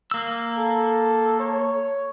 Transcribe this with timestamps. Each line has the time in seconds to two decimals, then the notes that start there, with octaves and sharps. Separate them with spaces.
0.11 A#3 E6
0.57 A4
1.40 C#5